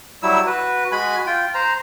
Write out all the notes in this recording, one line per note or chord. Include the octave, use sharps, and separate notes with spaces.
F#3 G3 E4 E6
F#4 B4
G#3 F#4 G#5 B5
F4 G5
C5 A#5